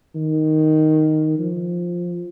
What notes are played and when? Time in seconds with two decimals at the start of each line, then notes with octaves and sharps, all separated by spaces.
0.15 D#3
1.39 F3